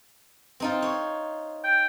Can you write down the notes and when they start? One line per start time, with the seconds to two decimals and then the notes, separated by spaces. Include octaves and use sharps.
0.60 C4 D#4 F4
0.82 C#5
1.64 G5